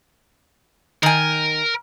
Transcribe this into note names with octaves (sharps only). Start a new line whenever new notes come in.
D#3 A#4 G#5